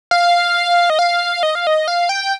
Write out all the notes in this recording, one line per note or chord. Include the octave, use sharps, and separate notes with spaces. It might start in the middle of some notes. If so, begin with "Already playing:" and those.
F5
D#5
F5
D#5
F5
D#5
F5
G5